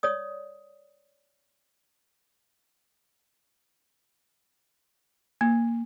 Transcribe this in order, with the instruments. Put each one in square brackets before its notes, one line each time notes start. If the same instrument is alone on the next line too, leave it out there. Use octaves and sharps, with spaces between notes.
[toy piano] C#5 D5 D#6
[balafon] A#3